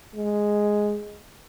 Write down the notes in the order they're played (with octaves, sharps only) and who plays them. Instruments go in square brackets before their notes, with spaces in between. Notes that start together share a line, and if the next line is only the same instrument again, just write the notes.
[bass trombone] G#3